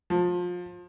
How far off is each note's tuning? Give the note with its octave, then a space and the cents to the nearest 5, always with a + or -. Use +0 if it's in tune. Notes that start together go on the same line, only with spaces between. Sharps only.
F3 +25